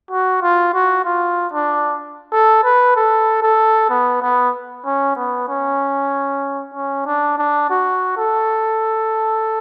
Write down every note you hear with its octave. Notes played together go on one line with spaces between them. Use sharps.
F#4
F4
F#4
F4
D4
A4
B4
A4
A4
B3
B3
C#4
B3
C#4
C#4
D4
D4
F#4
A4